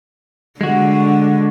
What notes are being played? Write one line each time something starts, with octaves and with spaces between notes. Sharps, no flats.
D3 G#3 F#4